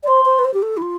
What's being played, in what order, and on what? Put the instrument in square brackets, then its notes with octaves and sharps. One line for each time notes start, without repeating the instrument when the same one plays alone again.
[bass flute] D5
[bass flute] C5 [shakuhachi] C6
[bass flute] C5
B4
C5
G4
A4
E4
F4